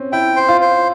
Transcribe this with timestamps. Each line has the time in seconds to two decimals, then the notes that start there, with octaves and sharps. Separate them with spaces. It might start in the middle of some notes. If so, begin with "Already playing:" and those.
Already playing: C4 C#4
0.12 E4 G5
0.36 C5
0.49 F4
0.61 C5